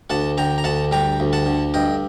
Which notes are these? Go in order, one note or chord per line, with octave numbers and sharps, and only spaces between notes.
D2 F#5 A5
D3 G5 A#5
A#5
D2 F#5 A5
G3 G5 A#5
D2
F#5 A5
D3
G2 D#5 G5